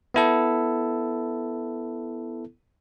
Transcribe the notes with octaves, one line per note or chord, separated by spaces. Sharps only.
B3 E4 A4